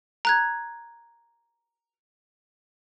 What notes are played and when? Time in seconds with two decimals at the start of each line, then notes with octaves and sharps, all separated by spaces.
0.25 A#5 F#6 G#6